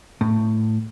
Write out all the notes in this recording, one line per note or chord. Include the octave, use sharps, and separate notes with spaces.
A2